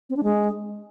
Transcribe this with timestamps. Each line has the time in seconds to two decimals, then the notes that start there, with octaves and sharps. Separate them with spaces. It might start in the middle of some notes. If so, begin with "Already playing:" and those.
0.09 C4
0.16 D4
0.23 G#3